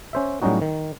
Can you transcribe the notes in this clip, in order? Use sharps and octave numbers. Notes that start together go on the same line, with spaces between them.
C#4 C5 E5
A2 F#3 G3 C#4 D#4 F#4
D#3